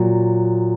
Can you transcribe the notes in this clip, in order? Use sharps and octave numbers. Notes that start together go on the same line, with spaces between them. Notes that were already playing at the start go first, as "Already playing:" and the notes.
Already playing: A#2 F#3